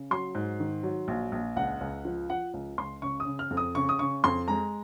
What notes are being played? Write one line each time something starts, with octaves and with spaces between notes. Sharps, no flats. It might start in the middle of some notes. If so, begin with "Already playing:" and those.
Already playing: C#3
F#3 C6
G#2
D#3
F#3
A#1
A#1
C#2 F#5
C#2
F3
F3 F#5
C#2
C#2 C6
C#3 C#6
D#6
C#3
F6
F2
D#6
C#3 C#6
D#6
C#3 C#6
F2 C6
G#3 A#5